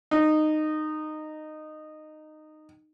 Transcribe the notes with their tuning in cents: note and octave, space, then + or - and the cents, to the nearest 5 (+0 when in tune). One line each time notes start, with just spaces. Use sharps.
D#4 -15